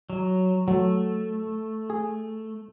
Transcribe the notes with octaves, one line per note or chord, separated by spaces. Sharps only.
F#3
F#3 A3
G#4